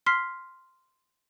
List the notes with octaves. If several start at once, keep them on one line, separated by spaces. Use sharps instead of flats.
C6 F6 B6 C7